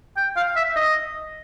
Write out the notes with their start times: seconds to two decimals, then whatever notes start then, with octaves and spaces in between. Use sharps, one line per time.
0.17 G5
0.36 F5
0.56 E5
0.76 D#5